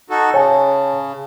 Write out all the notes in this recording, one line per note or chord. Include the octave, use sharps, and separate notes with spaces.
D#4 F#4 A4
C#3 C#5 G#5 A5